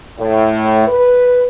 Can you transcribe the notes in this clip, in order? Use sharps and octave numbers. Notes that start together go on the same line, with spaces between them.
A2
B4